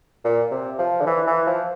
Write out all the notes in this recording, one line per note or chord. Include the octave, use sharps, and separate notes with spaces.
A#2
C3
F3
D3
E3
E3
F3